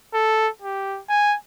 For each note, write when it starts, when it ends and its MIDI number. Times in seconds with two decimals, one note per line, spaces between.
0.14 0.48 69
0.62 0.99 67
1.09 1.36 80